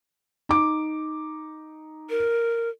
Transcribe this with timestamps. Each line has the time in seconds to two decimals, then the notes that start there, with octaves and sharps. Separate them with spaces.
0.49 D#4 D6
2.10 A#4